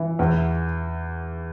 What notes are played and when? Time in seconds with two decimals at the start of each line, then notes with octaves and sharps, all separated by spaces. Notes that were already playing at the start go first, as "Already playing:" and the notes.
Already playing: E3
0.19 E2